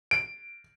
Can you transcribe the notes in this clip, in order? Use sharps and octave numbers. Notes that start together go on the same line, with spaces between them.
D7